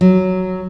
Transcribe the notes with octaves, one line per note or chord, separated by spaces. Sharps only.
F#3